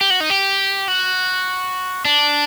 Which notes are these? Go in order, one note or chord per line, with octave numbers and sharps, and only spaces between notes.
G4
F#4
D#4
G4
F#4
D4